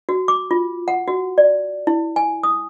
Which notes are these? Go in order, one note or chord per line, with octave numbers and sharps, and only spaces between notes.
F#4
D6
F4
F#5
F#4
D5
E4
G#5
D#6